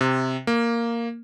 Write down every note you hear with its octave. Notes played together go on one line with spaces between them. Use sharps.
C3
A#3